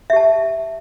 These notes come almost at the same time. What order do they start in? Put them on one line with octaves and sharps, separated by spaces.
E5 G4 A5